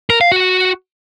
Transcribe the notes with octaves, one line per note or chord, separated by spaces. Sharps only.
A#4
F5
F#4